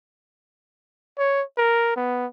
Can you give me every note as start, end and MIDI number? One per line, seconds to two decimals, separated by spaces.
1.18 1.43 73
1.58 1.96 70
1.96 2.26 59